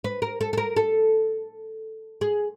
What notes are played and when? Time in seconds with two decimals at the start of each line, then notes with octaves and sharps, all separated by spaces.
0.04 B4
0.22 A#4
0.41 A4
0.53 A4
0.57 A#4
0.76 A4
2.21 G#4